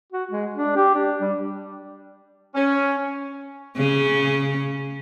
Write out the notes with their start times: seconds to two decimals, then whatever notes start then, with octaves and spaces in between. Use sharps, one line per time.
0.13 F#4
0.31 G#3
0.54 D4
0.76 G4
0.95 D4
1.21 G3
2.55 C#4
3.77 C#3 C#4